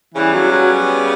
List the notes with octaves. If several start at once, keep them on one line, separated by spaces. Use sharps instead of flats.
C#3 E3 G3 B3
F#3
F#3